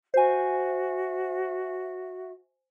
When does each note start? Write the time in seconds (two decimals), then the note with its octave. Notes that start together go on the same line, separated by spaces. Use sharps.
0.14 F#4 C5 E5 G#5